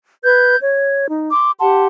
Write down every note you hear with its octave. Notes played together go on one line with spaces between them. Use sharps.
B4 G6 G#6
C#5
D#4
C6 D6
G4 F#5 A5 C6